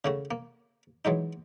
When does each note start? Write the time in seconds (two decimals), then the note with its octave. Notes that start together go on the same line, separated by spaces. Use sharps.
0.05 C#3 A3 F#4
0.31 A#3
1.05 E3 F#3 G#3 D#4